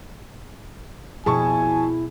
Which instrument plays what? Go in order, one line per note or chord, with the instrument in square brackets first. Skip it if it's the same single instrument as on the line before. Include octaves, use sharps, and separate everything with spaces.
[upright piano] F2 A5 C#6 [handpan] B2 G#4 [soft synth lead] E4 [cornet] G#5